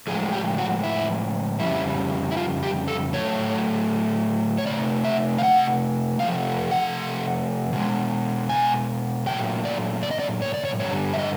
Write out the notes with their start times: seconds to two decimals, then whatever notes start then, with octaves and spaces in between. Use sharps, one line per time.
0.07 A2 F3 G#3 G#4
0.33 G4
0.58 F#4
0.84 E4
1.60 F2 C#3 G3 E4
2.31 E4
2.37 F4
2.63 G4
2.88 A4
3.13 A2 F#3 A3 C#5
4.58 C#5
4.66 C3 E3 A3 D5
5.05 E5
5.38 F5
5.43 F#5
6.20 C3 F3 A3 F5
6.71 F#5
7.73 B2 G#3
8.49 G#5
9.26 A#2 F#3 A3 G5
9.65 D5
10.03 D5
10.11 D#5
10.20 D5
10.42 C#5
10.54 D5
10.65 C#5
10.79 G2 D3 G3 C#5
11.13 E5
11.19 D#5